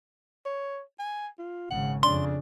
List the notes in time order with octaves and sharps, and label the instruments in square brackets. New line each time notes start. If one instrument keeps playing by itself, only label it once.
[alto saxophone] C#5
G#5
F4
[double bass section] G#1 C#3 [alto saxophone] F#5
[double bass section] F2 C#3 [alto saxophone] D4 [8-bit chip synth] C6